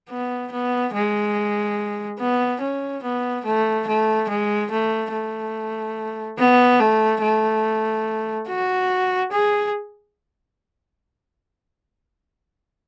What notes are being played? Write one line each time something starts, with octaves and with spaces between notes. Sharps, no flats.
B3
B3
G#3
B3
C#4
B3
A3
A3
G#3
A3
A3
B3
A3
A3
F#4
G#4